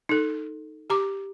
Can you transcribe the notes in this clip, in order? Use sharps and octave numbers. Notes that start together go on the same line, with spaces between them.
D#4 A4
G4 A#5 D6